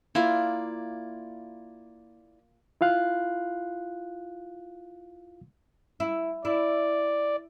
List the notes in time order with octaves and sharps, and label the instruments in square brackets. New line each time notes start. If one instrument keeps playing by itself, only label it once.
[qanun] A#3 F4 [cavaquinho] E4 D5
[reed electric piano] E4 F4 F5 F#6
[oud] E4
[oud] E4 [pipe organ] D5